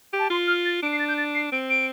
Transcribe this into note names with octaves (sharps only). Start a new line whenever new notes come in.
G4
A5
F4 C6
F6
A6
D4 D7
C7
A6
G6
A6
C7
C4 D7
D7